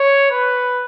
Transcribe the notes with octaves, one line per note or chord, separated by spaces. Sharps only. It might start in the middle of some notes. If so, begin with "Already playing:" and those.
Already playing: C#5
B4